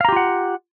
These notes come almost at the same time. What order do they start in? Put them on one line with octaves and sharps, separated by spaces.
F5 A#5 G4 F4 F#5